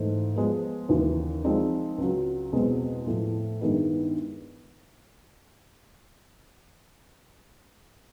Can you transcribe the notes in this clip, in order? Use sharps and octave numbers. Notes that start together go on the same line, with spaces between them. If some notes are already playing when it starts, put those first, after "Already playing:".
Already playing: G#2 E3 A3
F3 G#3 B3
D#2 C#3 E3
F3 G#3 C4 D#4
C#2 C#3 F#3
E2 B2 G#3 C4
A2 F3 A3
G2 D#3 G#3 B3 E4